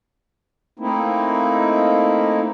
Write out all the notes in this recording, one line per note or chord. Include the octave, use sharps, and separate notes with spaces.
A3 A#3 C4 D#4 E4